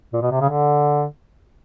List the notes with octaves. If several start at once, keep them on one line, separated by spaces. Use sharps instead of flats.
A#2
B2
C3
C#3
D3